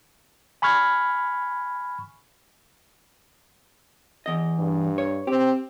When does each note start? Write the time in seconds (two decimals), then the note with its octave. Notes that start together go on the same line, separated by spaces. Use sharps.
0.62 G#5 B5 C#6 F6 G#6
4.26 E2 D#5
4.59 G2
4.98 C#5
5.27 C4 G4